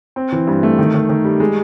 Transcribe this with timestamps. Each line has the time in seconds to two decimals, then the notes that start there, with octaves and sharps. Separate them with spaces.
0.16 C4
0.32 E3
0.47 G2
0.63 A3
0.79 D#3
0.94 D#3
1.09 D#3
1.24 G3
1.40 G#3